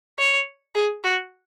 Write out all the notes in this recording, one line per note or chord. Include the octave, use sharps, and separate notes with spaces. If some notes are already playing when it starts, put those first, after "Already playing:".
C#5
G#4
F#4